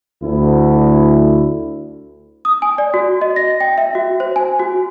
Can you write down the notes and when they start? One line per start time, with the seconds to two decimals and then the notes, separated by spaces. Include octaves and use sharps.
0.22 D2 E4
2.45 D#6
2.62 G#5
2.78 D5
2.94 F#4
3.21 D#5
3.36 A#6
3.61 G5
3.78 E5
3.95 F#4
4.20 C5
4.36 G#5
4.60 F#4